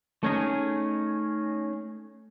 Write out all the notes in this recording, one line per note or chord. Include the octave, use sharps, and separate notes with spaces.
A3 C#4 D#4 G#4